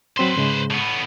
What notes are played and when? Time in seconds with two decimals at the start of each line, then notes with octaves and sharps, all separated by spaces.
0.18 F#3 C4 B4 C5 C6
0.36 G#2 C#3 G#3
0.71 A2 B3